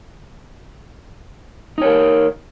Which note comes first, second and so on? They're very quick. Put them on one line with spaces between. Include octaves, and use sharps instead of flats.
D#4 C#5 A#4